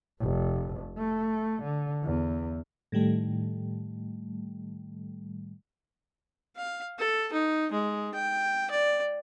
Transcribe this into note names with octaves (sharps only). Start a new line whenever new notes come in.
F1
A3
D3
E2
A2 D#3 G3 A3
F5
A4
D#4
G#3
G5
D5